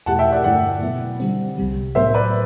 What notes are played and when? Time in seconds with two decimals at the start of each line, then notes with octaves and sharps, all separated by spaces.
0.06 E2 B2 A3 E4 G4 F#5 A5
0.19 E5 G5
0.32 D5 F#5
0.44 G2 D3 A3 E4 D5 F#5
0.82 B2 F#3 B3 E4
1.20 D3 G3 C4
1.58 C2 C3 G3
1.95 A2 F#3 B3 C5 E5
2.14 B4 D5